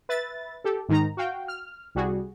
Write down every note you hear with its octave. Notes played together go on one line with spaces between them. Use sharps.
B4 E5 A6
G4 A4
G#2 D#3 D#4 A#5
F#4 F5 G5
F6
C2 G3 F#4 G#4